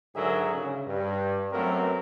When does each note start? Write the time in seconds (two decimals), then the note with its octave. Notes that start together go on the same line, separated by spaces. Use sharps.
0.15 G#2 D3 F#3 G#4 A#4 E5
0.54 C#3
0.86 G2
1.52 F#2 F#3 A3 B3 C4 A#4